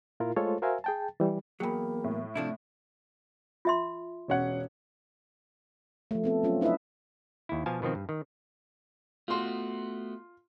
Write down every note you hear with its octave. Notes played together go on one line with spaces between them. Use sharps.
A#2 E4 F4 A#4
G#3 A3 F4 A4 C5 C#5
F#4 A#4 C5 E5 F5 G#5
G#4 G5 A5
E3 G3
E2 F#3 A#3 G#4 G5 B5
A2
C3 F3 A3 C4 D4 E4
F4 E5 C6
E1 C#4 F#5
F3 A3
B3 C4 A4
F#3 C#4 F4
D4 E4 B4 D#5 E5
D#2 E4
B2 F3 F5 G#5 A5
B2 D#3 F3 C4
G2
D#3
A3 B3 F4 F#4 C6